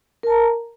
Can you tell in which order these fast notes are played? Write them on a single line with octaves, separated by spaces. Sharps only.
A#4 A5 A#5